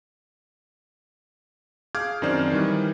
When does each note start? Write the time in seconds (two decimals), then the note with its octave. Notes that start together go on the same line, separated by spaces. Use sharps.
1.95 G#4 F5 D6 F6 G6 G#6
2.22 F#2 D#3 C4 D4 C5 D5
2.52 D#3 E3 G3